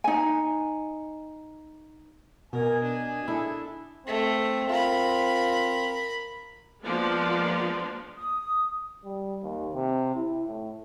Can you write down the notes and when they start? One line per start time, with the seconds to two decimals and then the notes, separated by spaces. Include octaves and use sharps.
0.04 D#4 G#5
2.53 B2 A#4 D#5 G#5
2.83 D4
3.28 E4 G#4 A4
4.07 A3 C4
4.70 F4 A#4 B5
6.83 F3 G#3 A#3 B3 D4 F4
8.17 D#6
9.04 G3
9.43 D#2
9.74 C3
10.15 E4
10.47 A2